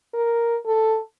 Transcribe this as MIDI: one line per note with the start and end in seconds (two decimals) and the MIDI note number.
0.14 0.56 70
0.66 0.99 69